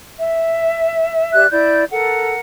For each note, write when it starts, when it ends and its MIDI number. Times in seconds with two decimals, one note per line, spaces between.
0.19 1.44 76
1.34 1.46 67
1.34 1.46 74
1.34 1.46 90
1.51 1.84 64
1.51 1.84 74
1.51 1.83 91
1.92 2.34 69
1.92 2.40 70
1.92 2.40 78